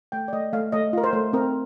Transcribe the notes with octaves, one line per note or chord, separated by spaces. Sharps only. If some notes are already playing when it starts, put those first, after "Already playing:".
A3 G5
D5
A3 D#5
A3 F5
A3 D#5
F4 A#4
C5
A3
C4 A#4